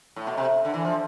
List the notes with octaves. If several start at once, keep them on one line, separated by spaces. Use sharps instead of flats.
A2
B2
C3
D3
E3
F3